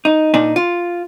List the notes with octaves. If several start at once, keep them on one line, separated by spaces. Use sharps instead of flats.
D#4
A#2 D4 D#4
F4